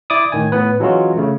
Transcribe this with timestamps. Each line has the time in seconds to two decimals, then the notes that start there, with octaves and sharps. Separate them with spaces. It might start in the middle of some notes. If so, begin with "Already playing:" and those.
0.10 E4 D5 D6 D#6
0.32 A2 D#3 G#5
0.52 A2 B3 B4
0.80 E3 F#3 G#3 C#4 F4 F#4
1.17 C#3 A3